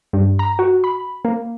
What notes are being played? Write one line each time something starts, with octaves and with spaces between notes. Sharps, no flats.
G2
A#5
F#4
B5
A#3